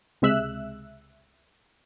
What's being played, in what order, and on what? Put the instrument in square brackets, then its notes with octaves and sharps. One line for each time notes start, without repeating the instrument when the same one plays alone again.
[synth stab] C#2 C3 G#3 E5 E6 F#6